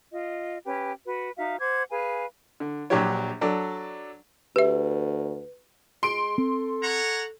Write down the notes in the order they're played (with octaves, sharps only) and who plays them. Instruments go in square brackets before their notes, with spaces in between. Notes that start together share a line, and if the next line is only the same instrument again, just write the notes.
[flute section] F4 D#5
C#4 G4 B4
F#4 B4
D#4 F#4 E5 F5
C5 F#5 D6 G#6
G#4 B4 F5 G#5
[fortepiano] D3
A#1 F#3 D4 F#4 G4 C#5
F#3 D4 A4 D5
[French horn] D2 [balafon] G4 E5 [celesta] B4
[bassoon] G#3 [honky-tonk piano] C6 D7
[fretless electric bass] C4 [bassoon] A4
[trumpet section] C#5 F#5 A#5